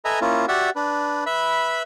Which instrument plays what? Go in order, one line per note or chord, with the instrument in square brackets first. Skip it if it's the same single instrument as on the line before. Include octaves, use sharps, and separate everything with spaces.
[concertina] A4 B4 D#5 E5 G#5 A#5
A#3 C#4 E4 F4
F#4 G4 D5 E5 F#5
D4 B4
B4 E5 B5